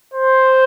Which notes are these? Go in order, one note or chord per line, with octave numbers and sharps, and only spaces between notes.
C5